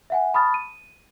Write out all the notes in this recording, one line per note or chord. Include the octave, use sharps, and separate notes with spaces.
E5 F#5 G#5
A5 B5 C#6 D#6 F6 A6
D#7